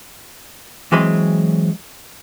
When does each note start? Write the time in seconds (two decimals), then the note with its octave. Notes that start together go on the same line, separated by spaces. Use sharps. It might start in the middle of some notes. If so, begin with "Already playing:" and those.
0.92 E3 F#3 G#3 C4 B4 C6